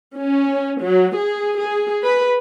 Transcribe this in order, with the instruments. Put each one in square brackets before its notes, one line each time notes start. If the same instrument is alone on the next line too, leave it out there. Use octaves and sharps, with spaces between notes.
[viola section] C#4
F#3
G#4
G#4
B4